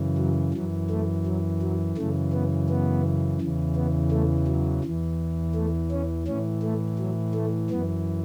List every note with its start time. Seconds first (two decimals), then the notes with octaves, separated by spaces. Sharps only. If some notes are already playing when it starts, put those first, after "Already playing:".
Already playing: F#2 C#3 E3
0.18 F#3
0.54 F#2 E3 F#3
0.90 A3
1.26 F#3
1.62 F#3
1.97 F#2 C#3 E3 A3
2.33 B3
2.69 B3
3.41 E2 C#3 E3
3.76 B3
4.11 A3
4.47 F#3
4.84 E2 E3
5.55 A3
5.91 C#4
6.27 A2 E3 C#4
6.63 A3
6.99 F#3
7.35 A3
7.70 F#2 E3 B3